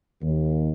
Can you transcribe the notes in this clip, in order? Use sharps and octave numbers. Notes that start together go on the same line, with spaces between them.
D#2